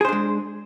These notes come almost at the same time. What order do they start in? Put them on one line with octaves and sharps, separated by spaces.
G#4 C5 D4 G#3